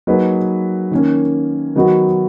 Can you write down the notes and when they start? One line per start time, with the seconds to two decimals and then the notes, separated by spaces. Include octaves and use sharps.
0.07 F#3 A#3 D#4 G#4 B4
0.91 D#3 A#3 C#4
1.76 D#3 F#3 B3 D#4 F#4